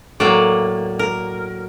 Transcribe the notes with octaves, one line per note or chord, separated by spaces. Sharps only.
A2 F#3 A#3 D5
A#4